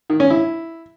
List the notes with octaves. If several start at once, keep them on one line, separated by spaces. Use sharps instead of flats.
D#3
C#4
E4